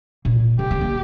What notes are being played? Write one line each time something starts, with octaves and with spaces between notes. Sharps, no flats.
A#2
D3 G4
C4
A#3